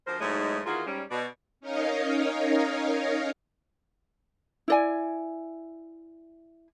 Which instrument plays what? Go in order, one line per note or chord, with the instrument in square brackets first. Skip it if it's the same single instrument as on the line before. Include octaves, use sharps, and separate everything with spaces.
[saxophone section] D2 F3 A#4 C5
E2 G#2 F#3 G#3 A3 D#4
D#3 E3 A#3 F4 F#4 G#4
G#2 G3 C#4
B2 D5
[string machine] C#4 D#4 A#4 C#5 D#5 F5
[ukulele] E4 D5 G#5